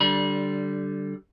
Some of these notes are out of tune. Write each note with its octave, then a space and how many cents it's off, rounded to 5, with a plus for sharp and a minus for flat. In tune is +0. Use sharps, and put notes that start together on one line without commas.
D3 +0 G3 -20 B5 -35